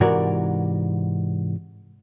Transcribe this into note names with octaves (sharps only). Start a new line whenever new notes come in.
G#2 C3 E3 F#4 A#4 D5